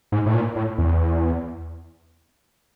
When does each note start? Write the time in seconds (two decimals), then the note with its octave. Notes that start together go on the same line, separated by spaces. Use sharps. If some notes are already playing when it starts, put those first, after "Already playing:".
0.12 G#2
0.26 A2
0.34 A#2
0.56 A2
0.78 E2